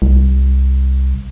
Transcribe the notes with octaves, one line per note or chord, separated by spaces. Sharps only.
C2